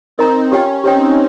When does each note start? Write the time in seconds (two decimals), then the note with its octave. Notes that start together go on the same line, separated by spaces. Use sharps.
0.18 C4 D#4 A#4 D#5 A#5
0.51 C#4 F4 G4 C#5 G5
0.84 C4 D#4 G4 C#5 G5